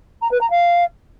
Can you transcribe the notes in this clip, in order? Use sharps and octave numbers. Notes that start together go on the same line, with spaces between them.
A#5
B4
A#5
F5